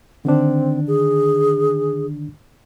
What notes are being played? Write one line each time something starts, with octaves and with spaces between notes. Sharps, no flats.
D3 D#3 C4 D4
G#4